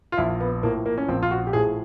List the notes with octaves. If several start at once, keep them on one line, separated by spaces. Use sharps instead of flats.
F4
A#1 E4
B3
A2 F3 A#3
A#3
C#4
A#1 C4
F4
F#4
G4
A2 F3 G#4